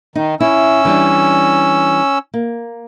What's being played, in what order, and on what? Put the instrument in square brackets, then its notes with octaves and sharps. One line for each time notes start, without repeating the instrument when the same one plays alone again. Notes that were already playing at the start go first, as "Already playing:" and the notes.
[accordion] D#3 [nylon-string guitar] D#4
[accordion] C#4 E6 [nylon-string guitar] E4
[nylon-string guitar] E3 G3 D4
A#3